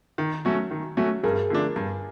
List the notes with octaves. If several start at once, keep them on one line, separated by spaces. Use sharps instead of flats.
D#3
F#3 A3 C#4 F#4
D#3
F#3 A3 C#4 F#4
G2 G#4 A#4
D3 F3 A3 D4
G2